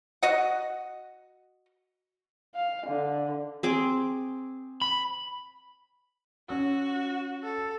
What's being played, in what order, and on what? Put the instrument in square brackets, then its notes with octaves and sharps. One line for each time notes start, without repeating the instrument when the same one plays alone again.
[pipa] F#4 D#5 F#5
[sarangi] F5
D3
[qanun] C4 G#4 D6
[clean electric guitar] B5
[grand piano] C#4 E6 [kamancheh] F#4
[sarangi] A4